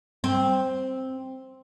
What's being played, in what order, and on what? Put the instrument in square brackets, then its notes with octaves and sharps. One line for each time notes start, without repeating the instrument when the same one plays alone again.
[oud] C4